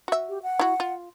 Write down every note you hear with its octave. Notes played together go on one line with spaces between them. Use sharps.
F#4 E5
G4
F#5
E4 F#4
F4